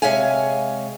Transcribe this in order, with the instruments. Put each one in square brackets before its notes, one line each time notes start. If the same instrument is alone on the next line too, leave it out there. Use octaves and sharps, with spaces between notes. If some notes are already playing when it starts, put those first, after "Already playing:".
[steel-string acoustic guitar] C3 G#3 C#5 F5 G#5